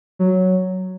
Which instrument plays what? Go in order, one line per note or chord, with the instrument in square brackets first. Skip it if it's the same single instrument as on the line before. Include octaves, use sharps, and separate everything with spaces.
[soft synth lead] F#3